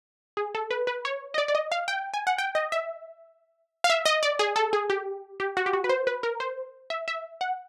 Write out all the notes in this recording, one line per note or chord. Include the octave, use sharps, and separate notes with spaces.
G#4
A4
B4
B4
C#5
D#5
D5
D5
D#5
F5
G5
G#5
F#5
G5
D#5
E5
F5
E5
D#5
D5
G#4
A4
G#4
G4
G4
F#4
G4
F#4
B4
C5
B4
A#4
C5
E5
E5
F#5